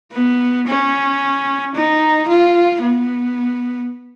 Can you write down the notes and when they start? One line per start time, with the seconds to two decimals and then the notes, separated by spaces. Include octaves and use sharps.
0.13 B3
0.67 C#4
1.75 D#4
2.28 F4
2.82 B3